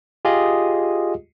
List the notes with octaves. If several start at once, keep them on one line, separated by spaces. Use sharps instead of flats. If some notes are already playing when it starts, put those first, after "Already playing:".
F4 G4 G#4 D#5